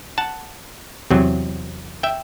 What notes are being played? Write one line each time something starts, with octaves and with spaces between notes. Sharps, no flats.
F#5 A5
E2 C3 F#3 C4
E5 G5